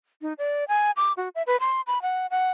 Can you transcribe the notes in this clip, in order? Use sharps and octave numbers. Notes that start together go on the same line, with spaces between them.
D#4
D5
G#5
D6
F#4
E5
B4
C6
B5
F#5
F#5